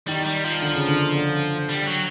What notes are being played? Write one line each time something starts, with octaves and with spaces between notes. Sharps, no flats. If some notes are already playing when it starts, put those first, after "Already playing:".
D#3 G3
G3
F3
D3
C#3
D3
D3
G3
F#3